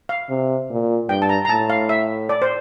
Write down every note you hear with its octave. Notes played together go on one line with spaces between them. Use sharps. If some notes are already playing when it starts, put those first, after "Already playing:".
F5
C3
A#2
G2 G5
A5
A#5
A#5
A2 A5
F5
E5
D5
C5